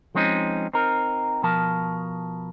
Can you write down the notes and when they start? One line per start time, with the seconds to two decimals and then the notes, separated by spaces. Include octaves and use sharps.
0.15 F3 G#3 C4 C#4 D#4
0.74 C4 D#4 A#4
1.43 B2 F3 A#4 A5